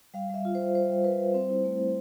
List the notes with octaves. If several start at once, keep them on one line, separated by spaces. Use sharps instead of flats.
G3 F5
G3 E5
F4
G3 C5
G3 C5
G3
G3 B4
G3
C4 C5
E4
A3
E4